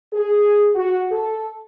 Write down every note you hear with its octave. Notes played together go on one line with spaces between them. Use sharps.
G#4
F#4
A4